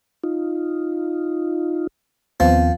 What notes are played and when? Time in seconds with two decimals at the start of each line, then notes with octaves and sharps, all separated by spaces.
0.24 D#4 F4
2.40 D#2 F3 B3 C4